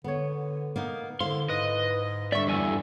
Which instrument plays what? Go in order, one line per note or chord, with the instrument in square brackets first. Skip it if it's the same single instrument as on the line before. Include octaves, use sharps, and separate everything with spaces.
[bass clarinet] D3 [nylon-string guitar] B3 C#5
[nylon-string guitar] A#3 B3 D#4
[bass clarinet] D3 [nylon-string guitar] E4 C5 F5 [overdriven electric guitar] C6
[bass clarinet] G#2 [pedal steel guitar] B4 [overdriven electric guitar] D#5
[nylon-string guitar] D3 G3 [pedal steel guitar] D5 C#6 [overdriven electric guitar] E5
[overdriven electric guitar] E2 G2 [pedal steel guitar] A4 G#5 E6